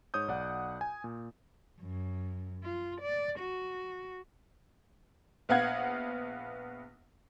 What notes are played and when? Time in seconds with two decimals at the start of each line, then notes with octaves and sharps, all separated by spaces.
0.14 G#2 C#5 D#6 G6
0.28 B1 D5 F#5
0.81 G#5
1.04 A#2
1.82 F#2
2.64 F4
3.01 D5
3.39 F#4
5.49 A#1 B3 F5 F#5 G#6